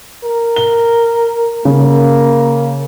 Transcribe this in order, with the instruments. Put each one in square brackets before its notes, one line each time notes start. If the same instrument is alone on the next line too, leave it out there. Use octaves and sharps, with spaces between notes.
[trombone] A#4
[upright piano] G7
[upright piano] C#3 [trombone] A#3